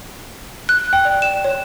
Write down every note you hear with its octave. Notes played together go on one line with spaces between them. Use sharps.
F#6
G5
D5
E7
C#5